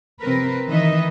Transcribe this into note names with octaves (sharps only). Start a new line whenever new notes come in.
C3 F3 C4 A#4 B4
D#3 E3 D#4 B4 D#5 E5